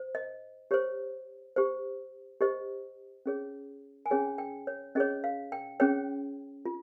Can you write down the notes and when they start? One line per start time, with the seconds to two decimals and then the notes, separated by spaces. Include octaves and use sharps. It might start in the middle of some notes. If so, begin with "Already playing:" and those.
Already playing: C5
0.15 D#5
0.71 G4 C5 C#5
1.56 G4 C5
2.41 G4 C5 D#5
3.26 C#4 G#4 C#5
4.06 G#5
4.11 C#4 G#4 C#5 G5
4.38 G5
4.67 C#5
4.95 C#4 G#4 C#5 D#5
5.24 F5
5.52 G5
5.80 C#4 G#4 C#5 G5
6.65 F4